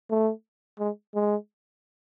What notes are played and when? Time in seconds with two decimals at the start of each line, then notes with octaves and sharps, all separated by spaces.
0.10 A3
0.79 G#3
1.15 G#3